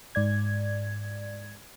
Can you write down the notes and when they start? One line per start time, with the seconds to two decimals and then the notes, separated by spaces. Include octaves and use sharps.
0.15 G#2 D5 G#6